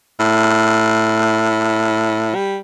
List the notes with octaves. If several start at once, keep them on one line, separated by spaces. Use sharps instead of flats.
A2
G3